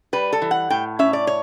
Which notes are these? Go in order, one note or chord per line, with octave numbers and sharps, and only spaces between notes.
G3 B4
A4
E3
F#5
A2 G5
C#4 E5
D5
C#5